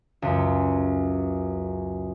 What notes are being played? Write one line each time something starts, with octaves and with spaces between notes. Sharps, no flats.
C#2 F#2